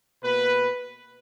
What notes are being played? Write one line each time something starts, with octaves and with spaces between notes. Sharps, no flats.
B2 A#3 B4